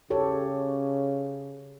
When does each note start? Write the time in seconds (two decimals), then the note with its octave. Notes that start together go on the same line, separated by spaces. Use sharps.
0.10 C#3 G4 A4 C#5